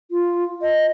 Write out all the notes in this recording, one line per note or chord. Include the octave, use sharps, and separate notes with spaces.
F4
D#5